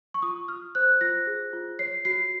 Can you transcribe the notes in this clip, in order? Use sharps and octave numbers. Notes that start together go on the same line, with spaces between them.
C#6
F4 D#6
F4 F6
C5 F#6
F4 A#6
G#4
F4
C#5 C7
F#4 C7